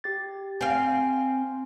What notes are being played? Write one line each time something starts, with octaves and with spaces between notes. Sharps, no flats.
G4 A6
C4 F5 G#5